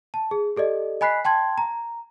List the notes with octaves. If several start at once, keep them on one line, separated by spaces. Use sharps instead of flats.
A5
G#4
G4 A4 D5 D#5
D#5 G#5 B5 F#6 B6 C7
G5 A5 C6 G#6
A#5